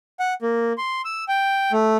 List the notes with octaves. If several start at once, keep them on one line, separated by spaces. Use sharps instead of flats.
F#5
A#3
C6
E6
G5
A3